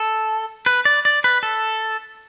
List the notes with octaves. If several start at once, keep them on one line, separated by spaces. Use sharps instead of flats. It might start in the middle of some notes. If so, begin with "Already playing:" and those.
Already playing: A4
B4
D5
D5
B4
A4